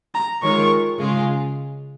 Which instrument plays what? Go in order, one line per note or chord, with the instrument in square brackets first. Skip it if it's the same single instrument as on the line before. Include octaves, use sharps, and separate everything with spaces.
[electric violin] A#5
[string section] D#3 G#3 F4 A#4 C#5 [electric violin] C#6
[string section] C#3 G#3 F4 G#4